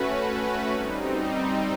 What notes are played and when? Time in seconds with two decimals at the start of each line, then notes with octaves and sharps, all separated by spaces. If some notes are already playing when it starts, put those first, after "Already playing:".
Already playing: A3 C#4 F#4 B4
0.73 G3 C4 D#4